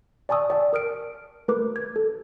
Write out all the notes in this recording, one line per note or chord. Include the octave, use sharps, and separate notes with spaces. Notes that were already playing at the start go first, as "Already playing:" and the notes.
D5 G#5 A5 C#6 D#6 E6
D5 G5 A5 C#6
A#4 D#6 F6 D7
A3 A#4 B4 D6
G#6
A4